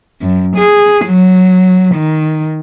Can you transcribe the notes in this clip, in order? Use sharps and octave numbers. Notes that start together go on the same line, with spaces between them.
F#2
G#4
F#3
D#3